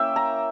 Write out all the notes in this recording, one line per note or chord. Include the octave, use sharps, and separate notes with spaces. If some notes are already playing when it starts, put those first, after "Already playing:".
Already playing: A#3 C#4 E4 E5 G5
A#5